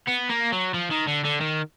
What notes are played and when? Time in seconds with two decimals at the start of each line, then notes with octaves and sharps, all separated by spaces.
0.08 B3
0.30 A#3
0.52 F#3
0.74 F3
0.91 D#3
1.07 D3
1.24 D3
1.41 D#3